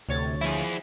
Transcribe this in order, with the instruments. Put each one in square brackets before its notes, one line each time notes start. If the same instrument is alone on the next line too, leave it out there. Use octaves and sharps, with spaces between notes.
[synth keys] D2 C#5 A6 [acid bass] C3
[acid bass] F3 [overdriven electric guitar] E4 G#4